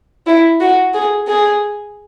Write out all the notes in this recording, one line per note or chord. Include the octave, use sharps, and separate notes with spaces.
E4
F#4
G#4
G#4